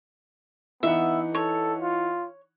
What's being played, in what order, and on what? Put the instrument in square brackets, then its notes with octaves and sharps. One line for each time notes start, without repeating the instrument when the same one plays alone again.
[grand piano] E3 D#4 F#5 [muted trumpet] B3 [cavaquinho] E5
[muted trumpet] A4 [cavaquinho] C#5
[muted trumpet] F4